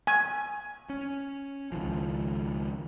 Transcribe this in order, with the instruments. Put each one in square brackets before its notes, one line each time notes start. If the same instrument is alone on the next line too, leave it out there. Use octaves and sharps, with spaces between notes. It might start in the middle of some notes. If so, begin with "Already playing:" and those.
[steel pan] G#5
[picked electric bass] C#4
C#2 D#3 F3